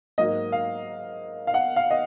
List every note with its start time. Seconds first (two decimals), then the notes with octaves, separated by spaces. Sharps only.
0.18 G#2 F#3 A#3 D#5
0.52 F5
1.47 F5
1.54 F#5
1.76 F5
1.91 D#5